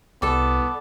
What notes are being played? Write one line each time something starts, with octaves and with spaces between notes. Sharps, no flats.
C2 B3 A4 D5